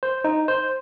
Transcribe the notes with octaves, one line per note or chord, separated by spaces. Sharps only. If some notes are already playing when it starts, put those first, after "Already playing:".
C5
D#4
C5